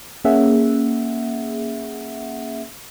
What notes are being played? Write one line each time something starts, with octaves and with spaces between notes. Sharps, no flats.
A#3 C#4 G#4 E5 F#5